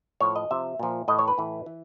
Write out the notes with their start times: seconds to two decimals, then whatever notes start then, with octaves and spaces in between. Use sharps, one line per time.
0.20 A2 F3 C#5
0.36 D#5
0.51 C3 F3 E5
0.79 A#2 F3
1.08 A2 E3 D#5
1.19 C#5
1.28 B4
1.38 A2 E3
1.66 E3